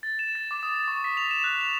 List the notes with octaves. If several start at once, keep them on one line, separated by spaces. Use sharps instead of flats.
A6
E7
A6
D6
D#6
C#6
B6
F7
E7
F#6
F7